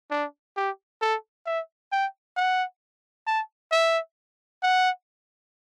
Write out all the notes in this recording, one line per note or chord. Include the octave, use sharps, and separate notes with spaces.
D4
G4
A4
E5
G5
F#5
A5
E5
F#5